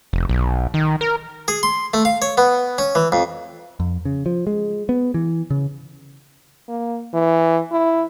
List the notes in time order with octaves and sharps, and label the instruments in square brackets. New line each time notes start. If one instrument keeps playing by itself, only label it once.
[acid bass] F1
B1
D#3
A#4
[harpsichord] G#4
C6
A3
F5
C#5
B3
C#4
E3
F2
[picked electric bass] F2
C#3
F3
G#3
B3
E3
C#3
[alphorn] A#3
E3
E4